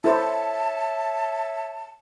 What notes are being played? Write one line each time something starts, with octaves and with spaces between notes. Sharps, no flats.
E4 A4 C5 C#5 E5 A5